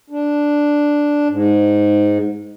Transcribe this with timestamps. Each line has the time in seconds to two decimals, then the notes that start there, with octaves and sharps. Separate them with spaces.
0.10 D4
1.29 G#2